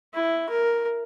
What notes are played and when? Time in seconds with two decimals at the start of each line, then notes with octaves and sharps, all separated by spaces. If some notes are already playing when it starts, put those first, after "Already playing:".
0.14 E4
0.49 A#4